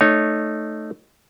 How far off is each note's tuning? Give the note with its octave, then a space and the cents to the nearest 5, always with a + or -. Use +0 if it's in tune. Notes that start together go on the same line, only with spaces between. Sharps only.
A3 +0 D#4 -15 C#5 +0